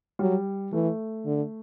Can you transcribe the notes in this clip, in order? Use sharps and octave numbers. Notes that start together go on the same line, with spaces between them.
F#3 G3
E3 A3
D3